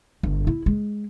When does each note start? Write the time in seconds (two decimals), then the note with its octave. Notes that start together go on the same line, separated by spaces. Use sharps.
0.23 G1
0.47 E4
0.66 G#3